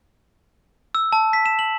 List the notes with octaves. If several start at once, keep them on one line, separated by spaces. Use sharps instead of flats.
E6
A5
B6
E7
F#7